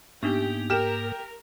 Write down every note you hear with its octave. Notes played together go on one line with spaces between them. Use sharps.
G#2 A#3 B3 D4 D#4 G4
G4 A#4 F6 E7